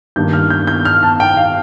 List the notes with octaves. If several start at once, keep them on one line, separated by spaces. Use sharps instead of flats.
G2 D#3 A#3 G6
F6
G6
G6
F6
A5
G5
F5